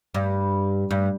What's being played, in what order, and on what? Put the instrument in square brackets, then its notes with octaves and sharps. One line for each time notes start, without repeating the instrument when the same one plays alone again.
[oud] G2
G2